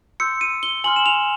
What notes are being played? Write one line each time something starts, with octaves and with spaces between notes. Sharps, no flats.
C6 E6 G6 C#7
D#7
G7
G#5 C6 F6 F#7
E7
F7